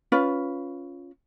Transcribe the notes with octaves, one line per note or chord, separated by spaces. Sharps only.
C#4 F4 B4